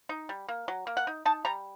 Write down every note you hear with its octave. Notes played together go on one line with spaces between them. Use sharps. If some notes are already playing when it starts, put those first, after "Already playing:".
D#4
G3
A#3
F#3
A#3
F#5
D#4
D#4 A5
G3 A#5